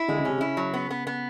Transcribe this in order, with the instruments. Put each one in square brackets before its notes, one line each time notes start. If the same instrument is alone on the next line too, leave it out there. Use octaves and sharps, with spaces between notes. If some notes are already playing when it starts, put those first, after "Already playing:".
Already playing: [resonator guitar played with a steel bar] E4
[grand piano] D3 [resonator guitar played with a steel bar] G#3
[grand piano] C#3
[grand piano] C3 [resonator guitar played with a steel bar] C#4
[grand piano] C#3 [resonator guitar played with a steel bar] E4
[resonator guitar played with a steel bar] F#3
B3
B3
B3